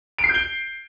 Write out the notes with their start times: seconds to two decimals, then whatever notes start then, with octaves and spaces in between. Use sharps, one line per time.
0.18 D7
0.24 C7
0.29 G6
0.34 G7